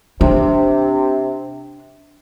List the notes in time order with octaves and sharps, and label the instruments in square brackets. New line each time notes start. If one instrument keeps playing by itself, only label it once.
[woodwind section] C3 [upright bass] D4